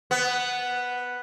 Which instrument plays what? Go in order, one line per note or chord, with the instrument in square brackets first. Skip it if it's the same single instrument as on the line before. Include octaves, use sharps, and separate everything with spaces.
[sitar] B3